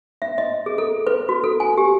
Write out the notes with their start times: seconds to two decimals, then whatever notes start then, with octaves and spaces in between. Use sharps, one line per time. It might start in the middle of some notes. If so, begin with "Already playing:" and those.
0.22 E5
0.38 D#5
0.66 G#4
0.78 A4
1.07 B4
1.29 F#4
1.44 A4
1.60 G#5
1.78 G4